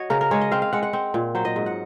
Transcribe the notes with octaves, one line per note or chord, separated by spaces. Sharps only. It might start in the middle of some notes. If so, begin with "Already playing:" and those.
Already playing: F#4 C#5 D#5
C#3 A#4
A#4
G#3 C#5
D#5
C4 F5
F5
G#3 F#5
F#5
C4
A#2
F#3 C5
D#5
G#2
F#5